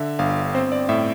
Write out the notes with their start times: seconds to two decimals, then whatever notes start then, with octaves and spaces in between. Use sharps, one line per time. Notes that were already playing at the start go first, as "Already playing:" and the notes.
Already playing: D3 E5
0.19 G1 F5
0.54 C4 C5
0.72 D5
0.89 A2 E5